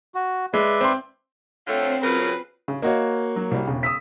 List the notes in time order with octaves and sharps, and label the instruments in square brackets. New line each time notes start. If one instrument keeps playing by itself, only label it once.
[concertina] F#4
[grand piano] G#3 [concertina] B4 D5 E5
[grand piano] C4 C6
[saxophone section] D3 A3 F4 [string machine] C4 C7 [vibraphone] C#5 G5
[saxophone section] C#3 F#3 A#4 [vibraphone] F4 [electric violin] B4
[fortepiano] C#3
[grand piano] A#3 F#4 C#5 [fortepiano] D#5
[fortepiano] F#3
C2 G3
[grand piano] E1 [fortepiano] C#3
[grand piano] D#6 E6 B6